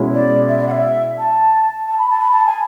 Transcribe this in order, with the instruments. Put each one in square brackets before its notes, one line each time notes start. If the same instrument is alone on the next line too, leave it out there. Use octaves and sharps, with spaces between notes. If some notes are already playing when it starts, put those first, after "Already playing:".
Already playing: [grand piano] B2 G#3 C#4 E4
[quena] D5
E5
D5
F#5
E5
A5
A5
B5
A5
B5
A5
G#5